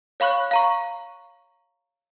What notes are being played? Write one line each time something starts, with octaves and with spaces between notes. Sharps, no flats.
C#5 F5 B5 C#6 F#6
F5 A#5 C#6